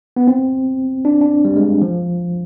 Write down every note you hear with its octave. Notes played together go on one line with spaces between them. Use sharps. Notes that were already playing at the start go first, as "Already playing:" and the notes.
B3
C4
D4
D4
G3
G#3
F3